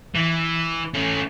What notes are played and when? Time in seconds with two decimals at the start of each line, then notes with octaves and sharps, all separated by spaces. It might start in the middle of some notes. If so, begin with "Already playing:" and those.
0.15 E3
0.94 A3 C#4